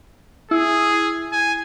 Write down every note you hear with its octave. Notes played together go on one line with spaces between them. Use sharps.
E4 G#4
G#5